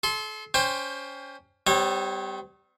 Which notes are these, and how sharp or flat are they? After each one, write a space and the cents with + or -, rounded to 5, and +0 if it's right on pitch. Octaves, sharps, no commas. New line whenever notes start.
A4 -35 C6 +0
C#4 +25 C5 +10 G5 +30
G3 +0 C4 -45 C#5 -35